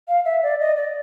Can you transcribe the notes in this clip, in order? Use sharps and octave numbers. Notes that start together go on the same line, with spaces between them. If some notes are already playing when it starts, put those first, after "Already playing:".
F5
E5
D5
D#5
D5